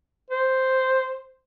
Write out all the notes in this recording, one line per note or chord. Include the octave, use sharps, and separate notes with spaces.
C5